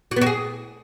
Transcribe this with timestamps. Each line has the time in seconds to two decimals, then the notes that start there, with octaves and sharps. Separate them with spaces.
0.11 F#4
0.16 B3
0.21 F#4
0.27 G#4